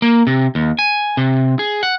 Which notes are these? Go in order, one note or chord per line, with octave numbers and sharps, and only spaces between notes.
A#3
C3
D#2
G#5
C3
G#4
F#5